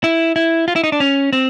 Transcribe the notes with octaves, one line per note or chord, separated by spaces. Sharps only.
E4
E4
F4
E4
D#4
D4
C#4
C4